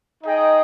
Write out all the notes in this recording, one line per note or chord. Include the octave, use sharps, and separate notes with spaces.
D#4 G#4 D#5 G5